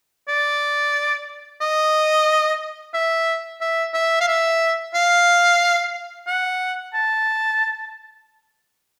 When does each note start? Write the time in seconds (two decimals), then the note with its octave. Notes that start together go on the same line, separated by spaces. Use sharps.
0.28 D5
1.61 D#5
2.94 E5
3.61 E5
3.94 E5
4.20 F5
4.28 E5
4.94 F5
6.27 F#5
6.94 A5